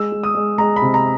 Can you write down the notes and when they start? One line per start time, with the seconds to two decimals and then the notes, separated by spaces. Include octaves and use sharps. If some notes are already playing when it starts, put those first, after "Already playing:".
Already playing: G#3 E6
0.12 G#3
0.23 D#6
0.35 G#3
0.58 G#3 A#5
0.76 B5
0.82 C3
0.94 A#5